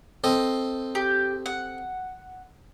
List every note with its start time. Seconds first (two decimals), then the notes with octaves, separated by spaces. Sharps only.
0.24 C4 A4 D#5
0.95 G4
1.46 F#5